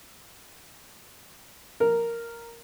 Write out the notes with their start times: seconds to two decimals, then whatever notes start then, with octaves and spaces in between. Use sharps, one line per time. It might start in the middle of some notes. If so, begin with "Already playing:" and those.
1.80 A#4